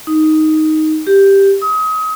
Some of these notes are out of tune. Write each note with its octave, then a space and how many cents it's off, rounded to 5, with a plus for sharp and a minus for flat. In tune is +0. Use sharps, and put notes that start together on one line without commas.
D#4 +5
G4 +5
D#6 +30